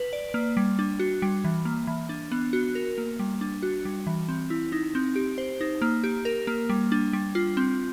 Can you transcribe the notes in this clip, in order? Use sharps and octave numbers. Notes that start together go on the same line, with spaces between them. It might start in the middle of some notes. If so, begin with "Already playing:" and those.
Already playing: B4
D5
A#3
G3
D4
F#4
G3
E3
A#3
E3
D4
B3
F#4
A#4
A#3
G3
D4
F#4
G3
E3
C4
E4
D#4
C4
G4
C5
D#4
A#3
G4
A#4
A#3
G3
D4
G3
F4
C4